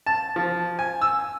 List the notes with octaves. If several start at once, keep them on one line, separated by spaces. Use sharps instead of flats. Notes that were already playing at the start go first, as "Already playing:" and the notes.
A5
F3
G#5
E6